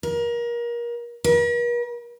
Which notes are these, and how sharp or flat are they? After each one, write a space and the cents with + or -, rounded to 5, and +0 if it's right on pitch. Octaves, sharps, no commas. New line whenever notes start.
A#4 +30
A#4 +45